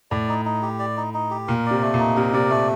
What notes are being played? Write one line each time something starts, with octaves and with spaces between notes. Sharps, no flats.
A2 D5
D#4
D#4
G4
D5
D#4
D#4
G4
A#2 A#4
D5
C3
A3
A#2
D#4
C3 A#4
C3 D5
A#2 A3